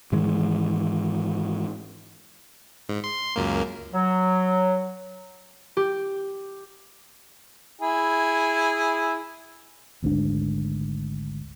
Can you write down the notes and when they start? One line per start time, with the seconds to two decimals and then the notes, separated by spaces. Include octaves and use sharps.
0.12 G#2 D#3 E3 G#3
2.89 G#2
3.04 C6
3.36 C#2 F#2 A#3
3.92 F#3
5.77 G4
7.81 E4 G#4
10.02 G#1 D2 G#2 D4